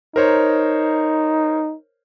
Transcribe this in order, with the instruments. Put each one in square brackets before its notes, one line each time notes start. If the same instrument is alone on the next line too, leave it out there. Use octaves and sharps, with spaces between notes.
[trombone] D#4 [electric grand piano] A#4 C5 C#5